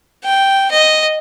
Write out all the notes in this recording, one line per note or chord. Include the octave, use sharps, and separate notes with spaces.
G5
D#5